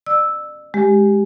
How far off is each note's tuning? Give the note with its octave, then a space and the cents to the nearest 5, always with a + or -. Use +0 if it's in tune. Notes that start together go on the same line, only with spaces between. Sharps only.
D5 +40 E6 -5
G#3 +0 G4 +0